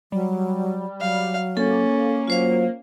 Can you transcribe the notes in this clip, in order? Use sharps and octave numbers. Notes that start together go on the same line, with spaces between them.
F#3 G3
F#3 F5
A#3 C#4 A4
F#3 F4 C5 F5